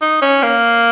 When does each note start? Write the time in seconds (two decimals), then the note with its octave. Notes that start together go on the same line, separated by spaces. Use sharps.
0.02 D#4
0.22 C#4
0.43 A#3